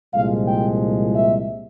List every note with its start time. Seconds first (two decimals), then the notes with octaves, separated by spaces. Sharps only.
0.14 C2 A#2 F3 G#3 F5
0.48 G5
1.15 E5